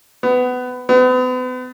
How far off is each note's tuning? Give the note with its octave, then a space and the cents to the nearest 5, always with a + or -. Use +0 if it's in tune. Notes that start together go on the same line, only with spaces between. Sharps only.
B3 +20
B3 +40